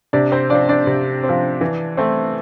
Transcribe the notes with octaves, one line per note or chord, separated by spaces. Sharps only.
C3 D4 D5
C4 C5
F3 C4 D4 D5
D4 D5
C3
C4
F3
E3
A3 C4